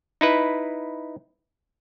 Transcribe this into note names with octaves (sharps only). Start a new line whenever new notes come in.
D#4 E4 B4